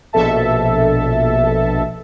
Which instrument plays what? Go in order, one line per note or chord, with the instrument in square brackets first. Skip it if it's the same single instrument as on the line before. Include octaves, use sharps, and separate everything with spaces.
[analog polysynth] A#1 B2 A4 E5 A5